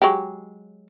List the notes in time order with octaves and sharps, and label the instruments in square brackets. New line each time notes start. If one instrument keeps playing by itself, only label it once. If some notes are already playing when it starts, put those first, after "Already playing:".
[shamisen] F#3 G#3 G4